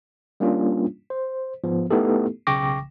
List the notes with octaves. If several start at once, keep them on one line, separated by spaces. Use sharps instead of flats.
G3 A#3 C#4 D4 F4
C5
G#2 F3 B3
A3 B3 D#4 E4 G4 A4
B1 C#3 G5 C#6 D6 A#6